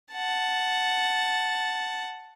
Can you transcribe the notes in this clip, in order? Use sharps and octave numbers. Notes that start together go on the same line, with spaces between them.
F#5 A5